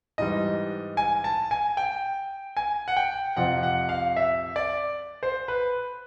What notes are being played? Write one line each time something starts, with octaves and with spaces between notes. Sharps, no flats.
G#2 E3 G3 D#5
G#5
A5
G#5
G5
G#5
F#5
G5
F2 C3 F3 F#5
F#5
F5
E5
D5
C5
B4